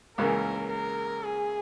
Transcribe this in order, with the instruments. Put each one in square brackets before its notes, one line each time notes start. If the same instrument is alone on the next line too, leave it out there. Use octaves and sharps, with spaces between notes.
[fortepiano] C#2 C#3 E3 A#3 [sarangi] A#4
[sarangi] A#4
G#4